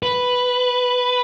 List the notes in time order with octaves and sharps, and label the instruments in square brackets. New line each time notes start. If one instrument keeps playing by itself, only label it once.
[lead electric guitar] B4